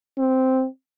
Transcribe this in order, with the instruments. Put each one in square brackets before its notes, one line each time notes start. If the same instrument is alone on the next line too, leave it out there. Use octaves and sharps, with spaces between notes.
[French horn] C4